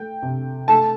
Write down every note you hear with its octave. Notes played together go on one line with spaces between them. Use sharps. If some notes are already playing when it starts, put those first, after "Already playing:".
Already playing: A3 G5
C3
A3 A5